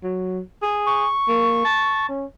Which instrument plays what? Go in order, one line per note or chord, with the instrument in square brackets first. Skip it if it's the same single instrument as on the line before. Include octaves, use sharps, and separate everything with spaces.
[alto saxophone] F#3
G#4
[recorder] C#6
[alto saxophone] A#3
A5
C#4